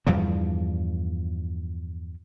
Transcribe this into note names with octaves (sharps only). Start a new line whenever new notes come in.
E2 G2 F3 G3